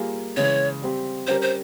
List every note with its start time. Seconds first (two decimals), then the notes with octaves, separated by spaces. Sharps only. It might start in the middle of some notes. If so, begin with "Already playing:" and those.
Already playing: G3 A#3 F4 G#4
0.36 C#3 E3 G#3 C#5
0.82 G3 C4 G4
1.27 G3 C#4 G4 A#4 C5
1.42 C5